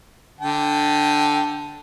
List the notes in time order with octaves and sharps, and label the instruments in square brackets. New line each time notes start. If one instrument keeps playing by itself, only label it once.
[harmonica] D3 G5 A5